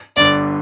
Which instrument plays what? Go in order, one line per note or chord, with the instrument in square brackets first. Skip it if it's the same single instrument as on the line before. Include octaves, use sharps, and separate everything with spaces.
[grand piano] G1 G2 D3 [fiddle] D5